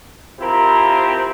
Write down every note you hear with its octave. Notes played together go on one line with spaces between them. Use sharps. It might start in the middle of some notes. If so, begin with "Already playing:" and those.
F3 C4 E4 G4 A#4